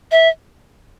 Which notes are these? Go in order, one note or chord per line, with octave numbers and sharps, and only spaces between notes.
E5